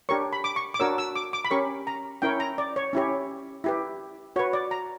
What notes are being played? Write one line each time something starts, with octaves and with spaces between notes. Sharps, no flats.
D4 G4 A#4 C#5 C#6
B5
D6
C#6
D6
D4 F#4 A#4 C#5 E6
E6
D6
D6
B5
C#4 G4 A#4 C#5 C#6
A#5
C#4 E4 A#4 C#5 G5
A#5
D5
C#5
C#4 E4 G4 C#5
E4 G4 B4
F#4 B4 C#5
D5
A#5